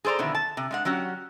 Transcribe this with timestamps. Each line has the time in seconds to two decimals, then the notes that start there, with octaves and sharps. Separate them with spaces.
0.05 G#4 A4 C5 D5 A#5
0.18 F2 B2 D3 D#3 E4
0.35 A5
0.57 C3
0.71 G#3 D4 F#5
0.85 F#3 C#4 F#4 G4